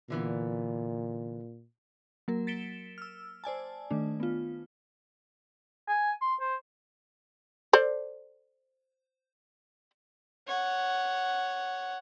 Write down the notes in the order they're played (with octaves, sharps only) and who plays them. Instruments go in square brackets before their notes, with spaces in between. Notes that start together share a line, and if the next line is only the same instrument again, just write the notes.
[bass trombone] A#2 [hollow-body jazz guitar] D3 E3 B3
[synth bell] F#3 A#3 A#4
A6 B6 C#7 D7 E7 G7
E6 F6
C5 D5 G#5 A5
D#3 A3 D4
B3 F4
[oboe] G#5
C6
C5
[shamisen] A4 C5 D5
[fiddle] C#5 F#5